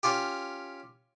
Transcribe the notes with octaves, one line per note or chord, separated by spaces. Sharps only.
C#4 F4 G4